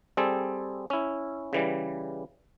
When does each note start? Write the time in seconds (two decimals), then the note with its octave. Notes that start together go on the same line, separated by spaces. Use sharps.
0.17 G3 C4 G#4 A4
0.90 C#4 E4
1.53 C#3 E3 G3